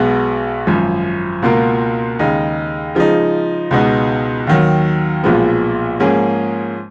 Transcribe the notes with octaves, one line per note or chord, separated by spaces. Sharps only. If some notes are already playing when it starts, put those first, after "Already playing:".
Already playing: B1 B2 G#3 B3
G#1 F#2 F3
C#2 B2 A#3 F4 A#4
D#2 C#3 G#3 D#4
C#3 F3 G#3 D#4
C#2 B2 G#3 B3 D#4
D#2 D#3 F#3
B1 A#2 F3 G#3 B3
G#2 F3 A#3 C#4 G#4